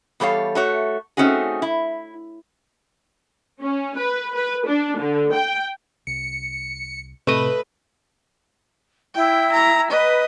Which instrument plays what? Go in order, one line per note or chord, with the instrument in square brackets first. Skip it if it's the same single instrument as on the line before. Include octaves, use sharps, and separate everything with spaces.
[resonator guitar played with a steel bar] E2 G3 A4 C#5 F5
A3 F#4 C#5
A3 C4 C#4 D#4 F#4 G#4
E4
[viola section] C#4
B4
B4
D4
D3
G5
[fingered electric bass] C2 [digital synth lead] C#7
[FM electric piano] A2 C3 [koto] A3 D#5 [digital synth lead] B4
[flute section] E4 [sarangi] G5
[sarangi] A#5
[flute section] B4 [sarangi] D#5